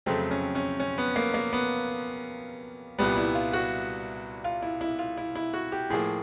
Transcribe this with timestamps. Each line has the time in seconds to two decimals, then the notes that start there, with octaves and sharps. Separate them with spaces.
0.06 F2 C#3 F#3 A3 C4
0.31 C#4
0.55 C#4
0.80 C#4
0.98 B3
1.16 A#3
1.34 A#3
1.53 B3
2.98 C2 A#2 G3 B3
3.17 E4
3.35 F4
3.53 F#4
4.44 F4
4.62 E4
4.81 E4
4.99 F4
5.17 E4
5.35 E4
5.54 F#4
5.72 G4
5.90 A2 F3 A#3 G#4